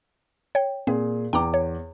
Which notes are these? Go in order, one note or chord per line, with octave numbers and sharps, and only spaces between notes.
C#5 G5
A#2 C4 G#4
E2 G5 A#5 D6
C#5